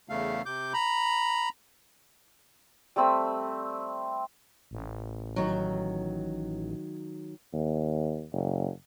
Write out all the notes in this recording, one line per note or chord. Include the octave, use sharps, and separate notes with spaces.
E2 C#3 A3 F5
C3 D6 G6
A#5 B5
G3 A3 C4 B5
A1
D#3 F#3
D#2
F#1